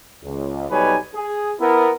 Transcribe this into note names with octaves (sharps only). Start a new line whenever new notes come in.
C#2
B1 G3 D#4 B4 C#5 G#5
G#4
B3 E4 A#4